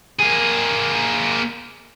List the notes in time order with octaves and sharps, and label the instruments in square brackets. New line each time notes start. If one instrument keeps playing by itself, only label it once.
[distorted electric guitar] A#3 G#4